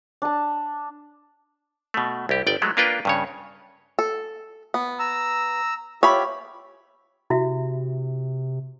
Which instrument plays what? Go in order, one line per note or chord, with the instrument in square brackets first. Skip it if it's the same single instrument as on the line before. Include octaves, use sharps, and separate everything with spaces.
[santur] D4 A5
[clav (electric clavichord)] B2 A3
C2 G4
G1 D5 G5
F#3 G#3 A3
A#3 D4 F4 A#4 B4 G5
G2 C#3 C#5
[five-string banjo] A4
B3
[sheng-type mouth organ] A#5 E6
[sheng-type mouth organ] F4 G4 E5 [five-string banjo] C#5 B5
[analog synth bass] C3 [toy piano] E4 F#4 E5